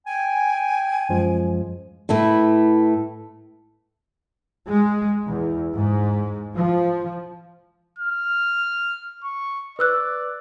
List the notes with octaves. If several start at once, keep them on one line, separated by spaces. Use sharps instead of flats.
G5 G#5
F#2 F3 G#3
A2 A3 E4 B4
G#3
E2
G#2
F3
F6
C#6
B4 D5 E6 F#6